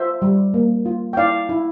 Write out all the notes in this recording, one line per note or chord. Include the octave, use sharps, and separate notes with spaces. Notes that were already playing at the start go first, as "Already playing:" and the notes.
Already playing: F4 C5 E5
G3
A#3
F4
G5
E4 D5 F5
E4